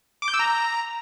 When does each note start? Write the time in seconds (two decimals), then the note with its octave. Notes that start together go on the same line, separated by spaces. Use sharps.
0.22 D6
0.28 G6
0.34 E6
0.39 A#5